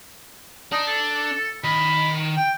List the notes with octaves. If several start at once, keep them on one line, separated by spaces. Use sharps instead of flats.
D4 D#4
A4
D#3 D#5 B5
G5